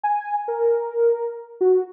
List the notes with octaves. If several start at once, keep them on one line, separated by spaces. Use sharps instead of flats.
G#5
A#4
F#4